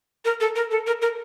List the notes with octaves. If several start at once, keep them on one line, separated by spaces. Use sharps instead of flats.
A#4
A4
A#4
A4
A#4
A#4